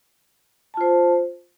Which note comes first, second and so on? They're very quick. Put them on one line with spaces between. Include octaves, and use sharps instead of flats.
A5 F4 C5